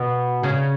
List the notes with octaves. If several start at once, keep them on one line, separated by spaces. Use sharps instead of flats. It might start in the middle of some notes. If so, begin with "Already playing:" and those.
Already playing: B2 B3
C#3 C#4